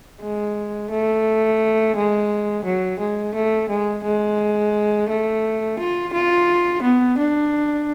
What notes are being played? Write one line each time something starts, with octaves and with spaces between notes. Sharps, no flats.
G#3
A3
G#3
F#3
G#3
A3
G#3
G#3
A3
F4
F4
B3
D4